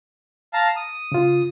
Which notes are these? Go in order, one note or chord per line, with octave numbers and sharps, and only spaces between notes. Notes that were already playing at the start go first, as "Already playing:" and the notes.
F5 A5 A#5
D#6
C#3 F4